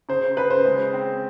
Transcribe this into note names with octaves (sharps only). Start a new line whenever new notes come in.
C#3 C5
C#3 B4
C5
G#3
C4